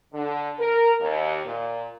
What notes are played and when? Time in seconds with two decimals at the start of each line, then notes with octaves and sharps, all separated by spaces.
0.13 D3
0.59 A#4
1.01 D#2
1.44 A#2